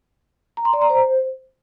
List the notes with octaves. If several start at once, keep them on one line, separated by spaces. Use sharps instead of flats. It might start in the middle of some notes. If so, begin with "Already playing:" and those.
A#5
C6
D5
A#5
C5